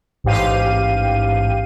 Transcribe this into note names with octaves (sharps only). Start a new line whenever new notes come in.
A1 G#2 G4 F5 D#7